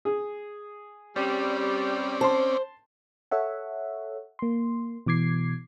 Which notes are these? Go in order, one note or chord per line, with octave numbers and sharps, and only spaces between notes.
G#4
G3 C4 C#4 D5
C5 A5 C6
A4 C#5 E5 F#5
A#3 C6
B2 E3 D6 G#6 C7